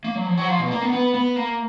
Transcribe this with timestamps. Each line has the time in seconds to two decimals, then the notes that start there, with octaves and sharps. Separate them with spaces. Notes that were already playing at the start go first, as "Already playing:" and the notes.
0.05 A#3
0.15 F#3
0.26 F3
0.38 F#3
0.48 F3
0.59 B2
0.71 A#3
0.82 B3
0.93 B3
1.14 B3
1.36 A#3